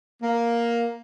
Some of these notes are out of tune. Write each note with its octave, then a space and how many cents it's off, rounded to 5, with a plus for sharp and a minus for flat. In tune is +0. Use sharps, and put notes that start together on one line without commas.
A#3 +5